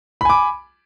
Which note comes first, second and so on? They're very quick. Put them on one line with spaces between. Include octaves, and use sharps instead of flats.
B5 G#5 D6